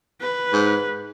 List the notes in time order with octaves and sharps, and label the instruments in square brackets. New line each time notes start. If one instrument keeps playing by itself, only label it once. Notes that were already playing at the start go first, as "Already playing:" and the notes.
[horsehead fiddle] B4
[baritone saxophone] G#2